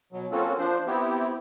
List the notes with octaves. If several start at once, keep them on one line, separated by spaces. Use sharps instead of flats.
B2 F#3
A#3 C4 C#4 F4 F#4 A4
F3 D4 C5
B3 C4 E4 G4